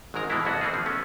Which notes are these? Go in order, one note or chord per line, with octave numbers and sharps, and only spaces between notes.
G#1 G#2 C#3 G#3 A#4 A#5
B2 E3 G#3 A#3 D4 E4
C2 F2 F3 B3 F#4
E3 G#3 C4 F4 F#4 G#4
A1 F3
A3 B3 C#4